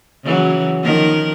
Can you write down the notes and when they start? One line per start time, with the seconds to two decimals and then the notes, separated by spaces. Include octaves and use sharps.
0.25 C#3 E3 F#3
0.83 D#3 F3 A#4